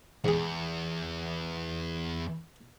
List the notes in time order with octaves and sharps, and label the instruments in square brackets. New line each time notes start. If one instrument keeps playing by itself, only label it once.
[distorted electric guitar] E2 [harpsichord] G#2 G#4